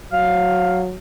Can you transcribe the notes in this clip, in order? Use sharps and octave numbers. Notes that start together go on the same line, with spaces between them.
F#3 F5